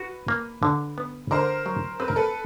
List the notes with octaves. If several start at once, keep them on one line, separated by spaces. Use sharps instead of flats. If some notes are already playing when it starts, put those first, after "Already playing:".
Already playing: F#4 B4
A#3
D3
B3
D3 A#4 C5
F#3
C4 B4
A#4
A4 B4